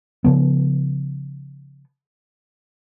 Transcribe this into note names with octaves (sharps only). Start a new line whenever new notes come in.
C#3 F3 B3